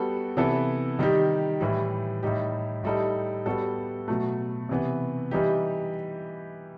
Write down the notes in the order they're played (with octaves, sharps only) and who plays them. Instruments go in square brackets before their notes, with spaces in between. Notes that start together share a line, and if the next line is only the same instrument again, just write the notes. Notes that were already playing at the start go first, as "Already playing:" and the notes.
Already playing: [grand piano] G3 B3 F#4 A4
C3 E3 B3 E4 A4
D#3 G3 D#4 G4
A2 E3 G3
A2 G3 D#4 G4
A2 G3 D#4 A4
G3 B3 F#4 A4
B2 F#3 A3
C3 E3 B3
E3 G3 D#4 G4